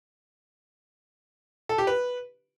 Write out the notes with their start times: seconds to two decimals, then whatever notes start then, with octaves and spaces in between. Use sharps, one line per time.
1.69 A4
1.78 G4
1.87 B4